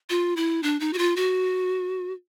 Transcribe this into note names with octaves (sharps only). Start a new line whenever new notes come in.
F4
E4
D4
D#4
F#4
F4
F#4